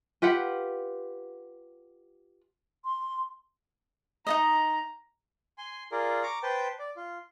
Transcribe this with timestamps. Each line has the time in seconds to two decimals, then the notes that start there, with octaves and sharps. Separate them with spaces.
0.22 F4 G4 B4 F#5
2.84 C6
4.27 D#4 F4 D#5 A#5
5.58 G#5 C6
5.92 F4 G#4 A#4 D5
6.23 A#5 C#6 D6
6.43 B4 C5 G5 A5
6.79 D5
6.97 F4